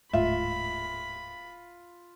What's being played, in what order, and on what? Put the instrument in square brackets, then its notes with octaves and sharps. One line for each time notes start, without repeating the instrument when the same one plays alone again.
[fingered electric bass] D1 G#2 A3 [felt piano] F4 [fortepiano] E5 [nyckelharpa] B5